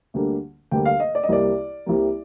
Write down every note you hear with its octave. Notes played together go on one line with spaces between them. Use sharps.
D2 D3 G3 A#3 D4
D2 D3 G3 A#3 D4 G5
F5
D#5
D5
D#5
C2 C3 G3 A#3 D5
C2 C3 G3 A#3